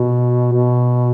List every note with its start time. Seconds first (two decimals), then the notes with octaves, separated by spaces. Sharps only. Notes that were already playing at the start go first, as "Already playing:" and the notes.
Already playing: B2
0.53 B2